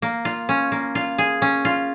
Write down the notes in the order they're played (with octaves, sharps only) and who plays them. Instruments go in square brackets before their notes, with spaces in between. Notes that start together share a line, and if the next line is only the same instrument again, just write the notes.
[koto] A#3
F4
C#4
A#3
F4
G#4
C#4
F4